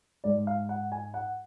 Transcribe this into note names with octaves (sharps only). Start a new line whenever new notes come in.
G#2 G#3 D5
F5
F#5
G#5
F#5